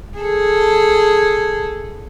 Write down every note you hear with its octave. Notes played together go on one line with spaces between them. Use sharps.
G#4 A4